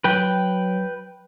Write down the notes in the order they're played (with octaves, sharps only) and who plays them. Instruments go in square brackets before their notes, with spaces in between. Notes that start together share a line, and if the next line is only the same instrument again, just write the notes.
[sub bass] F#3 [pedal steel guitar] B4 G5